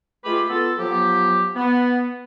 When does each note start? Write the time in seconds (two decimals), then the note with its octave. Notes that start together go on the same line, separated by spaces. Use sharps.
0.25 G#3 A3 F4 G4 B4
0.50 B3 F4 A4
0.79 F3 F#3 B3 G4
1.56 B3